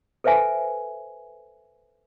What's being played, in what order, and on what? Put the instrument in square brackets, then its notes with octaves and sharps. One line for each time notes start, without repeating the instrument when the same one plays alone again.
[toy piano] A4 B4 C5 E5 G#5